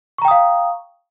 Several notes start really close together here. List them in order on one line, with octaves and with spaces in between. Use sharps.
C#6 A#5 G5 D#6 F5